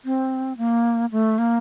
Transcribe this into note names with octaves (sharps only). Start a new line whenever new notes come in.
C4
A#3
A3
A#3